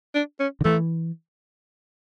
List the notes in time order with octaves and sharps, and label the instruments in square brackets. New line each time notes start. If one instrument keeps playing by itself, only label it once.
[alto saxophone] D4
C#4
[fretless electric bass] D3
[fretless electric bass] E3 [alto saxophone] A3